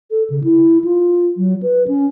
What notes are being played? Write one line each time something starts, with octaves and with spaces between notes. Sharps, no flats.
A4
C#3
E4
F4
F#3
B4
C#4